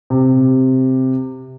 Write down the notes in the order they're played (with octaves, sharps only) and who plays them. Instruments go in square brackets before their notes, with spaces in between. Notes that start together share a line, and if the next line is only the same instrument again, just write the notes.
[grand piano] C3